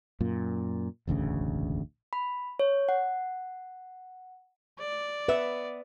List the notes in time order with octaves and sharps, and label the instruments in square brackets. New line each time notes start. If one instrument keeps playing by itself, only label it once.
[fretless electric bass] F#2 A#2
E1 A1 D2 C#3
[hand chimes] B5
C#5
F#5
[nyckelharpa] D5
[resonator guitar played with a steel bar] B3 E5 [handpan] B4